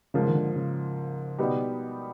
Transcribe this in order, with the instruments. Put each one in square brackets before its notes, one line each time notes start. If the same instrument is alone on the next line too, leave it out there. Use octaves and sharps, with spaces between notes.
[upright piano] G#2 F3 A#3 [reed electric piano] C#3
[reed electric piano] D#3
D3
C#3
[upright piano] B2 G3 B3 D#4 G4